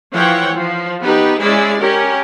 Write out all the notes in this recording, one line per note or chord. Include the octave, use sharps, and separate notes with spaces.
E3 F3 C#5 F#5 G5
F3
B3 D#4 G4 B4
G#3 C#4 E4 G#4 D5
C#4 G4 A#4